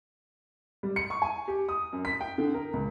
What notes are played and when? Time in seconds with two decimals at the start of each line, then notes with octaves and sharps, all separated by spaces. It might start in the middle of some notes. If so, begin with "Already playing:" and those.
0.83 G3
0.96 C#7
1.10 C#6
1.22 G#5
1.48 G4
1.69 D#6
1.93 F#2
2.05 B6
2.21 G5
2.38 D3
2.54 A#4
2.73 C#2